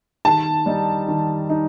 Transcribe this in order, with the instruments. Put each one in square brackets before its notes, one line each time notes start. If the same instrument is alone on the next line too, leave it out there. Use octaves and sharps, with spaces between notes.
[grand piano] D#3 [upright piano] A5
[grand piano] G3 D#4
D#3
D#4